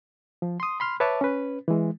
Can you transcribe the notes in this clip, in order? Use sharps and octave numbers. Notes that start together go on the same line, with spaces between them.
F3
C6 D#6
B5 C6 F6
B4 C#5 E5 A5 D6
C#4 B4
E3 G#3